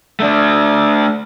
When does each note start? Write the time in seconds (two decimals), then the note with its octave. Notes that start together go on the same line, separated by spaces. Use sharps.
0.20 A3 D4